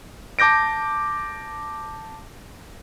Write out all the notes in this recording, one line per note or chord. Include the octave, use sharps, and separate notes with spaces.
A5 D6 G6 A#6 D7